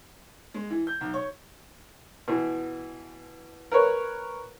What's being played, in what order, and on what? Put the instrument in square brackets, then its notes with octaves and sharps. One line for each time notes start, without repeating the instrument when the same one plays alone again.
[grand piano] G#3
E3
G6
B1
C#5
[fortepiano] B2 E3
A#4 B4 C#5